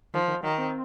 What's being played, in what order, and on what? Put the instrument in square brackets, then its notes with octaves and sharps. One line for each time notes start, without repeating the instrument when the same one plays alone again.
[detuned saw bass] D#3 [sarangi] F3
[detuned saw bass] D#3
[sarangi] D#3 [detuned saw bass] F#3
[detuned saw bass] C4